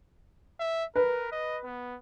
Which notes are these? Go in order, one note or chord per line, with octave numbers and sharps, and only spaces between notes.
E5
A#4 B4
D#5
B3